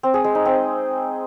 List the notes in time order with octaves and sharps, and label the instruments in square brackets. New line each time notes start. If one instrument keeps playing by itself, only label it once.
[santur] C4
G#4
G#3
D#4
C4